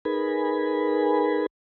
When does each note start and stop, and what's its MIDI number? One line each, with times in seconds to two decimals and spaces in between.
0.05 1.46 63
0.05 1.46 68
0.05 1.46 70
0.05 1.46 71
0.05 1.46 80
0.05 1.46 83